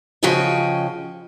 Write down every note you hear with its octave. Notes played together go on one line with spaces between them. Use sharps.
C#3 F3 F#4 D#5 G5 G#5